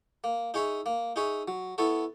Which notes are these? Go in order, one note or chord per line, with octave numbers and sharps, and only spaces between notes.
A#3
D#4 G#4 C#5 E5
A#3
D#4 G#4 C#5 E5
F#3
B3 E4 A4 C#5